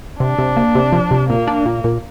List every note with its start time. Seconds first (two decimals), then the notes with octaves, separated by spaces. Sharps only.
0.20 C3 D4
0.39 C3
0.57 A#3
0.75 C3
0.92 F3
1.11 C3
1.29 A#2 A#3
1.47 D4
1.66 A#2
1.84 A#2